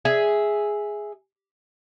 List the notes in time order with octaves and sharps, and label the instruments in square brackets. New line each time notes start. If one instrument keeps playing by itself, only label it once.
[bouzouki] G#4 E5